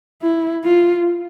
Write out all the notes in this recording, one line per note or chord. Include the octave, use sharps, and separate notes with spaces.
E4
F4